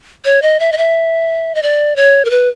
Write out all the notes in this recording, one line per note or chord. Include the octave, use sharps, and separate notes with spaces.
C#5
D#5
E5
D#5
E5
D#5
D5
C#5
A#4
B4